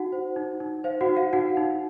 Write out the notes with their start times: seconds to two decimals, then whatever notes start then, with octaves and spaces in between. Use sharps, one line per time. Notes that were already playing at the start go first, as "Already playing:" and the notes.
Already playing: D#4 F#4 F#5
0.12 C5
0.36 D#4
0.60 D#4
0.84 C5 F5
1.01 F#4 F#5
1.08 D#4
1.17 F5
1.33 D#4 F#4 F#5
1.57 D#4